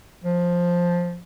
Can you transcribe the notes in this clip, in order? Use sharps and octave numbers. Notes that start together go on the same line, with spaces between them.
F3